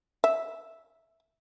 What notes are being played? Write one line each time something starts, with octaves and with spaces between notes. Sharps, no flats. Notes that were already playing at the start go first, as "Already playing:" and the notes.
E5